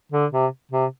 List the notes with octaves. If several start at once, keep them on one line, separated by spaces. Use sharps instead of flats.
D3
C3
C3